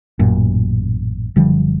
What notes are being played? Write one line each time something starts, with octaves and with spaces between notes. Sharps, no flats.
A1 F#2 A#2
F#1 D3 F3 G3